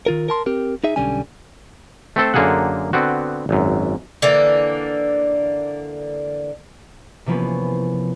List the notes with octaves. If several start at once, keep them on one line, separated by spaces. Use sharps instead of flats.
D#3 F4 A#4
A#4 A5 C6
C4 G4 A#4
D#4 G#4 E5
B1 D3 G3 C#4 G#5
A3 C4 A4 C5
F#2 D3 A#3 G#4 A4 F#5
D3 B3 C4 F#4
G#1 F#2
D3 E3 A#3
C3 E3 F3 A#3 B3 C#4